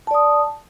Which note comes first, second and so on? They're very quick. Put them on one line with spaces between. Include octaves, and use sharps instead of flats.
A5 D5 D#6